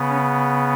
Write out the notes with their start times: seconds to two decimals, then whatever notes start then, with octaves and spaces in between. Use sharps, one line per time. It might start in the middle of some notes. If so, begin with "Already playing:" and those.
Already playing: C#3 B3
0.09 C#4